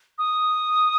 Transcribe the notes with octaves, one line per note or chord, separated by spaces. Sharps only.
D#6